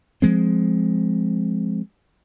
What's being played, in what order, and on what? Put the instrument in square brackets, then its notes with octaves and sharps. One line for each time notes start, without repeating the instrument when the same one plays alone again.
[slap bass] F3 G#3 C4